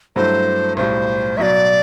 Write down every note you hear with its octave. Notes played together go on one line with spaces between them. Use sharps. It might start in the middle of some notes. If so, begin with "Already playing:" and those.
G2 F#3 A3 E4 C5
B1 A2 G3 C5
B1 B2 F#3 D5 E5